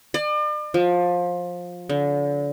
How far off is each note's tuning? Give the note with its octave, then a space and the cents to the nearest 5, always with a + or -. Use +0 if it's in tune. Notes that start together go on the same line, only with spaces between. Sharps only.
D5 +40
F3 +20
D3 -35